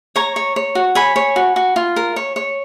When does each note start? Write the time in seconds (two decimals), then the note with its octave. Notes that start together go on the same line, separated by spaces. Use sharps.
0.16 C#5 A#5 C#6
0.36 C#5
0.56 C#5
0.75 F#4
0.95 C#5 G#5 B5
1.16 C#5
1.36 F#4
1.56 F#4
1.76 F4
1.96 A#4
2.16 C#5
2.36 C#5